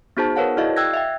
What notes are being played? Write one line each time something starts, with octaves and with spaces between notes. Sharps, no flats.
B3 D#4 F#4 G#4 C5 A5
A#4 B4 C#5 F5 F#5 A5
E4 F#4 G#4 D5 D#5 F5
G5 E6 F#6 G#6 A#6
E5 F5 G5